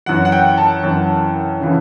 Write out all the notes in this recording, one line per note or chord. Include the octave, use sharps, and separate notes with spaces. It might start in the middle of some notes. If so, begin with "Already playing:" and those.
F#2 E3 F#5
F#5
G5
A5
F#2 E3
C#3 E3